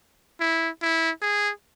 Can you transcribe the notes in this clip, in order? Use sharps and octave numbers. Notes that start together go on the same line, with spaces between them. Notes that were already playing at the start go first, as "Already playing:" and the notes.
E4
E4
G#4